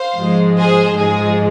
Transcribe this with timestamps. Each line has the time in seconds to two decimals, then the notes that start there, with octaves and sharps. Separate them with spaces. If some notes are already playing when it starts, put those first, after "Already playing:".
Already playing: C5 F5
0.18 G#2 F3 G#3
0.58 G#4 C5
0.98 G#2 F3 G#3 G#4